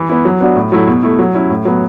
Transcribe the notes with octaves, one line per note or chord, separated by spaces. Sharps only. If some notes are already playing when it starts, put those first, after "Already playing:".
Already playing: E3
B3 E4
F#3
B3 D4 F#4
A2
F#3 A3 E4
B2
A3 E4
F#3
C#4 E4
A2
F#3 B3